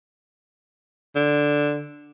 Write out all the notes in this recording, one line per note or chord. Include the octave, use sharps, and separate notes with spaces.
D3